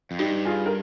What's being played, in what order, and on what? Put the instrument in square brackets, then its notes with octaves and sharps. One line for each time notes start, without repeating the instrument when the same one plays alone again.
[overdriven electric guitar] F2
[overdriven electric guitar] G2 [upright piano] D#4 G4
[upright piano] F4 G#4
A#4